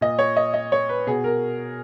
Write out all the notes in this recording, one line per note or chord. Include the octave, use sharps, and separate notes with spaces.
A#2 D#5
C#5
D#5
D#5
C#5
B4
B2 G#4
A#4